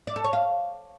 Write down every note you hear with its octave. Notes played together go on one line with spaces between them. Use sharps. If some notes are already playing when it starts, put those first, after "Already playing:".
D5
A4
C#5
F5